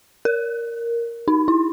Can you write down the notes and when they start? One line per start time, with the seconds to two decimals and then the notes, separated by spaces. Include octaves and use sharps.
0.25 A#4
1.28 D#4
1.48 E4